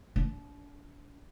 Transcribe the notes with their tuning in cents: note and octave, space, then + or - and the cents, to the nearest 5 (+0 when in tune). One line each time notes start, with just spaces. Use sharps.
D4 -35